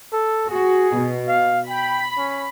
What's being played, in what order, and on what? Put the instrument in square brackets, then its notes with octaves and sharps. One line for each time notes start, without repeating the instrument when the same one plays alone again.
[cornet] A4
[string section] F#4 [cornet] G#4
[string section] B2
[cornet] F5
[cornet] G5 [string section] B5
[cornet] C#4